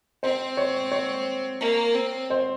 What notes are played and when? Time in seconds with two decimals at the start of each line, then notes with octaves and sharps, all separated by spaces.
0.23 C4 C5
0.57 C#5
0.92 C#5
1.60 A#3
1.95 C4
2.30 C5